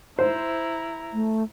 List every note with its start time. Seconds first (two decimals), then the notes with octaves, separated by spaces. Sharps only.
0.19 E4 C5 A#5
1.13 A3